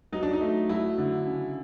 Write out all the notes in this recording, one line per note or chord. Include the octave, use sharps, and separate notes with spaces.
F#3 D#4
D4
D#4
A3
F#3 E4
D3
C#3